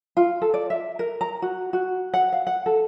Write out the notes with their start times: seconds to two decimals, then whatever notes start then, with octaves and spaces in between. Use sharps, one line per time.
0.17 F4
0.42 A4
0.54 D5
0.70 E5
0.99 A#4
1.21 A#5
1.42 F#4
1.73 F#4
2.14 F#5
2.32 F5
2.47 F#5
2.66 A4